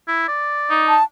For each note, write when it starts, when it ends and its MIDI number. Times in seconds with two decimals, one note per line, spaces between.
0.08 0.27 64
0.28 0.96 74
0.70 0.97 63
0.88 1.03 81